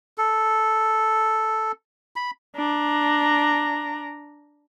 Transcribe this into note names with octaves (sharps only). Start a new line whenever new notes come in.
A4
B5
D4 A#5